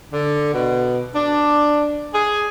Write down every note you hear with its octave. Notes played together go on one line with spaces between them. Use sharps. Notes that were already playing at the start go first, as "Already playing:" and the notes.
D3
B2
D4
G#4